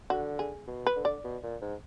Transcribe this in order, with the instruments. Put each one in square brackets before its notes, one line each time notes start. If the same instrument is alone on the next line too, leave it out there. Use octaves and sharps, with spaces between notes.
[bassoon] D3 [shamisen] F#4
[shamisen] G#4
[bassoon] B2
[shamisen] B4
[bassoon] D3
[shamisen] D5
[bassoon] B2
A#2
G#2